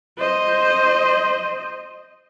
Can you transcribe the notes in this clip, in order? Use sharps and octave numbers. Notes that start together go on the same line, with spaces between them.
C5 D#5